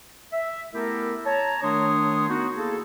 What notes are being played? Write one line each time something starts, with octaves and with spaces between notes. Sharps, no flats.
E5
A3 B3 E4 G4 A4 A#4
C#5 A5 A#5
D#3 A3 D4 C#5 C6 D#6
B3 D#4 F#4
A#3 E4 G#4 A4